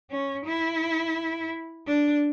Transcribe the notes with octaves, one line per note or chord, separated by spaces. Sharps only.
C#4
E4
D4